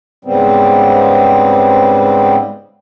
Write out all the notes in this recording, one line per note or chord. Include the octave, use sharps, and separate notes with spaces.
G#2 C#3 G3 B3 C4